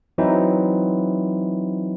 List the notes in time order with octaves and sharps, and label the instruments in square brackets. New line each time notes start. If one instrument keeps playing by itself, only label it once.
[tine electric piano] E3 F#3 C4 D#4 E4